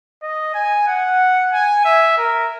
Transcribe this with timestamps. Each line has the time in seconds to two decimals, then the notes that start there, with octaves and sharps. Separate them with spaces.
0.23 D#5
0.54 G#5
0.87 F#5
1.53 G#5
1.85 E5
2.18 A#4